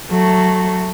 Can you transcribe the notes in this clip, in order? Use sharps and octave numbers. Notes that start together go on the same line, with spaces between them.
F#3 A3